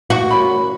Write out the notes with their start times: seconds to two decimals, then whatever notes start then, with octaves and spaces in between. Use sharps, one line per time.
0.10 F#4 C#6
0.31 B5